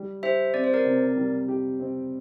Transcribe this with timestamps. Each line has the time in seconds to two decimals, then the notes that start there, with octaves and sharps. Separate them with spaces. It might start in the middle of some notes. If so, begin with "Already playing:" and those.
Already playing: G3
0.23 G4 C5 E5
0.54 C4 D5
0.64 C5
0.74 A#4 D5
0.85 C3
1.16 G3
1.48 G4
1.80 C4